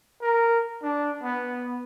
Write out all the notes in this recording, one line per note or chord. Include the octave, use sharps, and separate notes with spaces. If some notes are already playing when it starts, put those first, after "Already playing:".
A#4
D4
B3